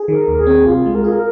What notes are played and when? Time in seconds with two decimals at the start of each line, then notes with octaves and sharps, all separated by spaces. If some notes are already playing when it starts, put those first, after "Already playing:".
Already playing: G#4
0.08 D#3 A#4
0.28 D#2
0.38 G#4
0.47 C4
0.66 C2 F4
0.86 G#3
0.95 A#4
1.04 F4 G#4
1.12 A#4